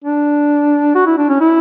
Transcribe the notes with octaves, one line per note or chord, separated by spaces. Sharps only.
D4
F#4
E4
D4
C#4
E4